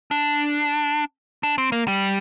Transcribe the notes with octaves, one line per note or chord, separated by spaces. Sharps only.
D4
D4
C4
A#3
G3